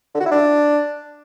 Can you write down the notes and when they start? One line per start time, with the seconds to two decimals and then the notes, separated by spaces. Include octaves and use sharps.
0.15 D3
0.20 F#4
0.26 E4
0.31 D4